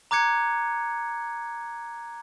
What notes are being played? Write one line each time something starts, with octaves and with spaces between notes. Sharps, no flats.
A#5 D6 F#6 G#6 C#7